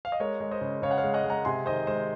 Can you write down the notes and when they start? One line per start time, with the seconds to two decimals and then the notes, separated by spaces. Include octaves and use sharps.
0.05 F5
0.12 D#5
0.20 G#3 A#4 C#5
0.41 G#3
0.51 C5 D#5
0.61 C#3
0.82 C#3 C#5 F5
0.91 F#5
0.98 C#5 F5
1.04 G#3
1.14 D#5 F#5
1.24 G#3
1.30 F#5 A#5
1.45 C3 G#5 C6
1.66 D#3 C5 D#5
1.87 G#3 C5